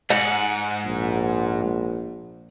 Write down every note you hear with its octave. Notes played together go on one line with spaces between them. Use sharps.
G#2 F#5
A#1